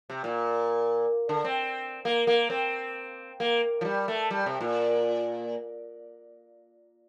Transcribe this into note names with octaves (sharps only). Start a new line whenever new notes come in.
C3
A#2
D3
C4
A#3
A#3
C4
A#3
F3
G3
A3
G3
C3
A#2